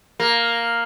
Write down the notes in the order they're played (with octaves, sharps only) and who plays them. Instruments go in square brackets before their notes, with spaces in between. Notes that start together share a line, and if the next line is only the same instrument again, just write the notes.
[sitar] A#3